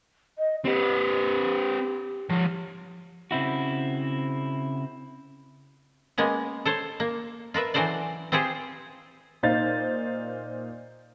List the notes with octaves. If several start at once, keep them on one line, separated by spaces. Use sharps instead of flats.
D#5
C4 G4 B4
F3 C#5
C#3 C4 E4 F#4
G#3 A#3 B3 C#4
A4 C5 C#5
A#3
F4 A#4 B4 E5
E3 F#3 F#4 A4 C5 D5
C4 F4 G4 G#4 C5
A#2 D#4 C5 F5 A6